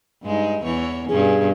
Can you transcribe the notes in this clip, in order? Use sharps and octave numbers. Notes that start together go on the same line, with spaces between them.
G2 G#3 D#4
E2 E3 C#5
G2 B2 C#4 G#4